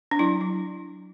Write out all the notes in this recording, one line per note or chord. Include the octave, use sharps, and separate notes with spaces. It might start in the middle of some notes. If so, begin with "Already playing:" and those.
D4
F#3 E4
F#3